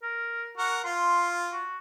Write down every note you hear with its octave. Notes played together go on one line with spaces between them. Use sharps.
A#4
F#4 A#4 F#5
F4 C6
F#4